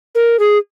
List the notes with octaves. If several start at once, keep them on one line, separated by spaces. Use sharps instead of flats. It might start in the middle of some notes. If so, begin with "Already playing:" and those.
A#4
G#4